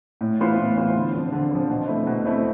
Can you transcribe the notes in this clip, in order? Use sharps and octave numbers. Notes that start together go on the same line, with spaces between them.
A2
E3 B3 F4 C5
A2
E3 B3 F4 C5
D3
F3 C4
D3
F3 C4
B2
A3 C4 E4
B2
A3 C4 E4